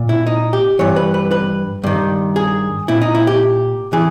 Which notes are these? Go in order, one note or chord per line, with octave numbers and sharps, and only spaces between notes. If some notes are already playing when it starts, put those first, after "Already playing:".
Already playing: A#2
E4
D#4
G4
G2 E3 C#5
B4
B4
B4
G2 D#3
G#4
A#2 E4
D#4
E4
G4
E3 G#4